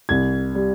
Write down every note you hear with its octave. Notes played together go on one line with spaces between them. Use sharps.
C2 G#6
G3